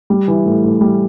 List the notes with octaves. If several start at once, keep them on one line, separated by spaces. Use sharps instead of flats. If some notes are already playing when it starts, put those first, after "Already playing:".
G3
E3
A2
A2
G3